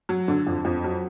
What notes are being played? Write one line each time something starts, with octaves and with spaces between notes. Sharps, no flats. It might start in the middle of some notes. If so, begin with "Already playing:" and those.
F#3
D3
F2
F2
F#3